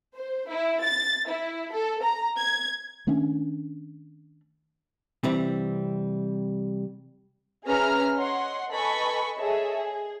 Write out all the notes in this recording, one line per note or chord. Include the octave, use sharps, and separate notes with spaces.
C5
E4
A6
E4
A4
A#5
G#6
D#3 A3 C#4 D4
C3 E3 G3 C4
C#4 G#4 B4 E5 A#5 F6
C#5 D#5 F#5 C6
A4 B4 D#5 G#5 B5 C#6
G#4 A4 C#5 D#5 E5
G#4